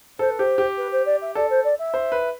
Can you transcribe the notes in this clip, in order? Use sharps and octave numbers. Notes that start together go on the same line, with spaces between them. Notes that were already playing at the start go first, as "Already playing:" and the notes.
A4 C5
B4
G4 C5
G4
B4
C5
D5
E5
A4 D5
C5
D5
E5
C5
B4